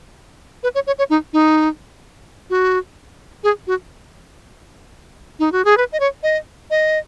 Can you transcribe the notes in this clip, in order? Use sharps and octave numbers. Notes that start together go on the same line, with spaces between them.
B4
C#5
C#5
C#5
D#4
D#4
F#4
G#4
F#4
D#4
F#4
G#4
B4
D#5
C#5
D#5
D#5